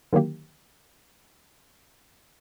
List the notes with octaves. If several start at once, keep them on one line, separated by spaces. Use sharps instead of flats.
D3 D#3 F#3 A#3 G4